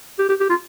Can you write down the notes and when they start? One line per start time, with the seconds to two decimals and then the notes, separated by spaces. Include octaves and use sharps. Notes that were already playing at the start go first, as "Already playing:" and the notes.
0.19 G4
0.29 G4
0.40 G4
0.49 F4